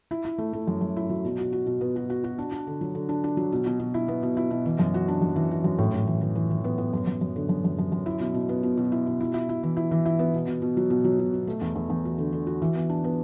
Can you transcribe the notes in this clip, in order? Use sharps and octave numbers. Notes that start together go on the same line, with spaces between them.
E4
E4
A3
A3
F#2
F#2
E4
F#3
B2
F#4
F#4
B2
B3
F#4
F#4
F#4
D4
D4
D3
F#3
D3
D4
D4
F#3
B2
B2
B2
E4
B3
B2
E4
B2
E3
F#2
F#4
D4
F#2
E3
F#4
F#2
A2
A2
E3
E3
E3
E3
B3
B3
F#2
F#2
F#2
D3
F#2
F#2
F#2
F#2
E4
B2
B2
B3
B2
B2
E4
B2
E4
E4
E4
E3
E4
E3
E4
B3
B2
B2
B2
F#3
B2
F#3
B2
B2
A3
E2
E2
E2
F#4
D3
D3
F#4
E3
B3
D4
B3